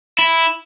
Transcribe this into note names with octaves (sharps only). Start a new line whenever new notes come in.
E4